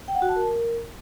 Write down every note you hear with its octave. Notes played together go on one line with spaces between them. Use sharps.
G5
F#5
F#4
A5
A#4